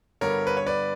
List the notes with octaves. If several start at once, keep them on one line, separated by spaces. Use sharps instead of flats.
G2 D3 G3 B3 A#4 C#5
B4
C#5
B4 D5